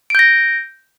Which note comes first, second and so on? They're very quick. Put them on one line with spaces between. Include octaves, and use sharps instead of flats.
D7 G6 A#6